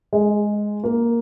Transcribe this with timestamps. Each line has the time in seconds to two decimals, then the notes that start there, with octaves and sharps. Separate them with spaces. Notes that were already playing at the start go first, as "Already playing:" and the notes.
0.13 G#3
0.84 A#3